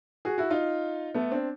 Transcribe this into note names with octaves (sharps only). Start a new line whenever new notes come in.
F#4 G#4
E4 F#4
D#4 F4
A3 B3
C4 D4